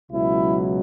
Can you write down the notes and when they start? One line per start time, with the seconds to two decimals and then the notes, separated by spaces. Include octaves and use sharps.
0.12 C#2 B2 F#3 E4